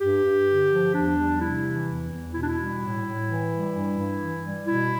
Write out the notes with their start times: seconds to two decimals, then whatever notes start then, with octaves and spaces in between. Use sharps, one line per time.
0.01 G2 G4
0.24 G2
0.48 D3
0.71 F3
0.94 E2 D4
1.18 G3
1.41 C3 E4
1.65 E3
1.88 E2
2.12 E2
2.34 B2 E4
2.42 D4
2.49 E4
2.58 G3
2.81 A2
3.05 A2
3.28 E3
3.51 G3
3.74 G2
3.98 G2
4.21 E3
4.44 G3
4.67 B2 E4